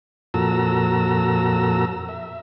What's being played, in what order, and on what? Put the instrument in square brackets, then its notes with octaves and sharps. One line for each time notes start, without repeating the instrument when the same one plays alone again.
[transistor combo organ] F2 A#2 F#4 A4 A#5 E6
E5